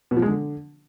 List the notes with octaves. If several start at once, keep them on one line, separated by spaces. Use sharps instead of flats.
B2
F3
G#3
D3